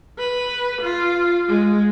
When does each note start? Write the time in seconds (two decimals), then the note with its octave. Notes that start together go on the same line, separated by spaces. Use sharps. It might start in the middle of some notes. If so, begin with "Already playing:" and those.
0.19 B4
0.81 F4
1.48 G#3